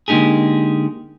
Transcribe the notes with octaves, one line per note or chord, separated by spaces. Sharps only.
D3 G#3 A#3 D#4 G4 G#4